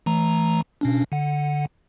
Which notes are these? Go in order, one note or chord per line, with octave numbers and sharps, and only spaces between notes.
E3 A3 A#5
B2 C#4 D4
D3 F#5